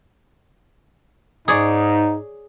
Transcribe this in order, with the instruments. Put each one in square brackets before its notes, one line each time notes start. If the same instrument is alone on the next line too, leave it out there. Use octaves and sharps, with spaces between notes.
[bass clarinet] G#2 [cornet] D#4 [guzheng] G#4 C#5 D5